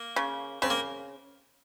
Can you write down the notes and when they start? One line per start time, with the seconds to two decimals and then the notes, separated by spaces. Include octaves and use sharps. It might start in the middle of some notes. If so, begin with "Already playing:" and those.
Already playing: A#3
0.16 C#3
0.62 C#3 C4
0.70 A#3